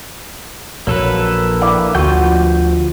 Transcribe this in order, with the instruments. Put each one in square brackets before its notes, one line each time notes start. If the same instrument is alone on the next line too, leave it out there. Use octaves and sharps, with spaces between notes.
[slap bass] A#1 [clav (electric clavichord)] F#3 [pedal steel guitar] A#3 A4 B4
[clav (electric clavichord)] E4 D5 F5
[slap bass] D2 F3 [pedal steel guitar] F4 G6 [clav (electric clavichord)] F#4